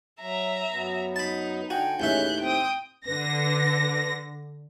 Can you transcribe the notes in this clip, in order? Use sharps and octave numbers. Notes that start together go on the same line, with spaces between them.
F#3 E5 A#5
F#2 B3
D#4 A5 B5
D3 F#4 G5 G#5
D#2 A2 E3 G#3 C#4 E5 F#6 G6
C4 G5 D#6
D3 B4 A#6